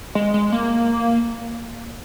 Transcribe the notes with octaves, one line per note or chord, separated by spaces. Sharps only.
G#3
G#3
A#3